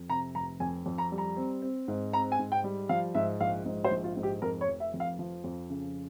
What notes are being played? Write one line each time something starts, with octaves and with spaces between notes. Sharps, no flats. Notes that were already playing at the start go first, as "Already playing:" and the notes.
Already playing: F2
C3 A#5
F1 A#5
F2 G#5
F2
A#5
G3
A#5
C4
C4
G#2
C4 A#5
G#5
G#2
G5
G3
F3 F5
G#2 E5
A#1 F5
G#2
C5
A#1
F4
G#2
G4
F2 A#4
C#5
F1
E5
F2
F5
F3
F2
C#3